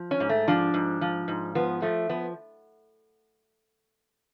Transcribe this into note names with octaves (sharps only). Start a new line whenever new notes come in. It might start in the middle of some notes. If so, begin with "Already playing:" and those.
Already playing: F3
C#4
G#2
A3
F3 D4
G#2
F3
G#2
F3 B3
F3 A3
F3 B3